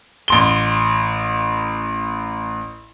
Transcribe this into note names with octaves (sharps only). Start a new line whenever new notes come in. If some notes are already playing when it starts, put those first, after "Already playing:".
A1 C6 G7